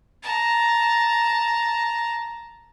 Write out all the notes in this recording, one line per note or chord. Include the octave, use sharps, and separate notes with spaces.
A5 A#5